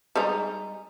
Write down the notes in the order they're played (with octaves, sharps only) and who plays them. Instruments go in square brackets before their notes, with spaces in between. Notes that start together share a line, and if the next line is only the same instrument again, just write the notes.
[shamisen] G3 G#3 D#4